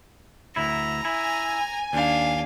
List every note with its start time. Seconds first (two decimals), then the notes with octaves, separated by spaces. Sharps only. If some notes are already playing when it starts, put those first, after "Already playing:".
0.56 D2 E4 A#5
1.05 E4 G#5
1.93 D#2 D4 F5